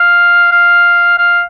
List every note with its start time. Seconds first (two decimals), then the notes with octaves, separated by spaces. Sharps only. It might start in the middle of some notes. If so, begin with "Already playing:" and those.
Already playing: F5
0.51 F5
1.18 F5